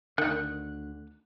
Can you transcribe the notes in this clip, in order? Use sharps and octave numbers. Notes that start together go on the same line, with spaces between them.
D2 D3 D#3 F#6